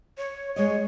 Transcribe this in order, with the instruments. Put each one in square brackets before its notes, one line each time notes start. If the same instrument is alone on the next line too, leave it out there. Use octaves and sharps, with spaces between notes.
[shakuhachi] C#5
[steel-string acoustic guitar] G#3 D#5 [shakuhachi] C#5